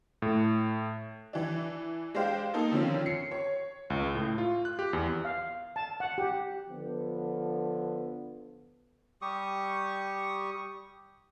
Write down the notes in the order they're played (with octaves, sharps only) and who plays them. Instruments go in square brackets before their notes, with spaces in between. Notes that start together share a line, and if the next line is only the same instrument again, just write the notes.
[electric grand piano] A2
[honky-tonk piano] E3 D4
G#3 D4 G4 C5 F5 G5
A#3 D#4 A4
D3 D#3 F3 C4 C#4 F4
C7 C#7
C#5
[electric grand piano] C#2
A2
F4
F#6
G4
E2
[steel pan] F5
A5
F#5
G4
[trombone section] D3 F3 B3
[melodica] G3 G4 C#6 D#6